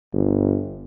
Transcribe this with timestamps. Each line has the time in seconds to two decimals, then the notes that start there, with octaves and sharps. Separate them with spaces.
0.14 G1